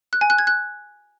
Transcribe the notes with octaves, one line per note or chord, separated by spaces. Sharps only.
F#6
G#5
F#6
G#6
F#6